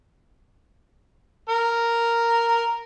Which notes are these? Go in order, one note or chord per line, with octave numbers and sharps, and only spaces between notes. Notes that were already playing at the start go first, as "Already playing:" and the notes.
A#4